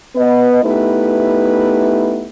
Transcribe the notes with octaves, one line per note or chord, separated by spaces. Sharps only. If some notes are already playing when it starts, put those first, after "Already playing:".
B3 B4 D#5
A3 B3 D#4 E4 G4 B4